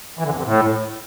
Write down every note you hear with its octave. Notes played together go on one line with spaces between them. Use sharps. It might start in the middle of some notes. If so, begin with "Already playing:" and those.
E3
D3
F2
C3
A2